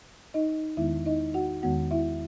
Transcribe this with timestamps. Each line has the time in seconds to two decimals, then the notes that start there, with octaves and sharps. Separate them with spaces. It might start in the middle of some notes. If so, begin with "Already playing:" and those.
0.34 D#4 D#5
0.77 E2 D#3 G#3 B3 E4 E5
1.06 D#4 D#5
1.34 F#4 F#5
1.63 E2 D#3 G#3 B3 F#4 F#5
1.91 E4 E5